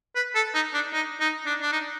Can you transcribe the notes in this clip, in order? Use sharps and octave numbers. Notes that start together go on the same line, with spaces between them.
B4
A4
D#4
D4
D#4
D#4
D4
D4
D#4